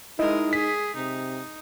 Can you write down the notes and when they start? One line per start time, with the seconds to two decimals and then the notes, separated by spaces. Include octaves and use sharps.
0.19 G#3 D#4 E4 A#4 D#5
0.53 G#4 B6
0.96 C3 D#4